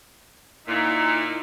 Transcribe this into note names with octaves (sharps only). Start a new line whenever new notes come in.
A#2 D#4 E4